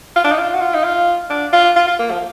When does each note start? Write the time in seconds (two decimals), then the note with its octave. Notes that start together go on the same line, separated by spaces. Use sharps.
0.16 F4
0.24 D4
0.31 D#4
0.39 F4
0.54 F#4
0.61 F4
0.75 D#4
0.84 F4
1.30 D4
1.53 F4
1.76 F4
1.87 F4
1.99 A#3
2.11 F3